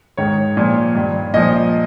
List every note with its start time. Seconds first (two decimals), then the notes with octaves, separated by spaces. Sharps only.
0.17 G#2 D#3 C#5
0.57 A#2 F3
0.95 G2 D#3
1.34 A#2 F3 D#5